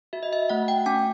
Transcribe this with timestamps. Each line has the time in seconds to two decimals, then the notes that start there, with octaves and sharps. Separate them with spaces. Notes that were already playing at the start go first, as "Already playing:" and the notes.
0.13 F#4 E5
0.23 D#5
0.33 E5
0.49 A3 F#5
0.68 G5
0.86 C#4 G#5